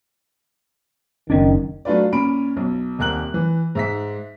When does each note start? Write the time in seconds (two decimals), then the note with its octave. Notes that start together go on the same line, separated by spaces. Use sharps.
1.30 F#1 D#3 C#4 D4
1.85 F#3 A3 D4 F4 B4 D5
2.12 A#2 C#4 B5 D7
2.57 B1
2.99 D#1 C2 A#4 F#6 F#7
3.34 E3
3.75 G#2 E5 B6